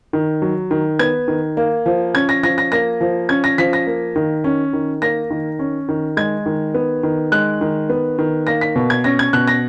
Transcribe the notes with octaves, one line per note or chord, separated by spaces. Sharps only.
D#3
F#3
D#3
B3 G#6
D#3
A#3
F3
C#4 G#6
A#6
F3 A#6
A#6
A#3 A#6
F3
C#4 G#6
A#6
F3 B6
A#6
A#3
D#3
C#4
D#3
A#3 A#6
D#3
C#4
D#3
G#3 G#6
D#3
B3
D#3
G#3 F#6
D#3
B3
D#3
A#3 A#6
B6
B2
G#6
C#4 A#6
G#6
B2 F#6
A#6